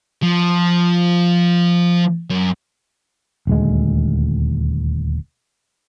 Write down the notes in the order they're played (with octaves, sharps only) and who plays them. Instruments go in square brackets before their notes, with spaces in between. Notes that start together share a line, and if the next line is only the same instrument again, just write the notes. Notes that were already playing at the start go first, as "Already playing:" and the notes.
[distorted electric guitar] F3
F#2
[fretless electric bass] D#1 D2 G#3